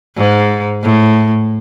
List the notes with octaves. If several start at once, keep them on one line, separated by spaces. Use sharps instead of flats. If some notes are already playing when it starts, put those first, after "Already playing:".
G#2
A2